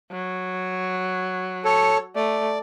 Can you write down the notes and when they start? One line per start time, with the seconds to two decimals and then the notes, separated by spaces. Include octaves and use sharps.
0.11 F#3
1.65 A4 C#5
2.16 A3 D5